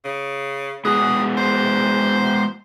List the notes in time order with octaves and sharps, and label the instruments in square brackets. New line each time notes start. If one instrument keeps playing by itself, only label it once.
[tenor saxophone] C#3
[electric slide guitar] G#3 B3 F#4 [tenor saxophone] G#4
[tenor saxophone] C5